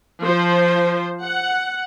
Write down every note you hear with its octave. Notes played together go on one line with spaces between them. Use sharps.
F3 C5
F#5